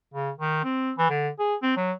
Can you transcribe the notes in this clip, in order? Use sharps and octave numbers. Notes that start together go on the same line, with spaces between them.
C#3
D#3
C4
E3
D3
G#4
C4
F#3